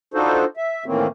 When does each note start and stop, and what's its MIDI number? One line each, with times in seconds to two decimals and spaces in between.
0.14 0.45 62
0.14 0.45 63
0.14 0.45 65
0.14 0.45 66
0.14 0.45 69
0.14 0.45 72
0.57 0.84 76
0.86 1.07 45
0.86 1.07 51
0.86 1.07 52
0.86 1.07 58
0.86 1.07 60
0.86 1.07 61